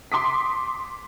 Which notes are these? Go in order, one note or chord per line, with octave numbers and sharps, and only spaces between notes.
C6 D6 D#6 B6